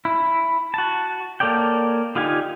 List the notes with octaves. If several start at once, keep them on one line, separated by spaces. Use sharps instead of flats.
E4
F#4 A5
A#3 A4 C#5 D5 G5
D3 D#4 F4 G4 G#5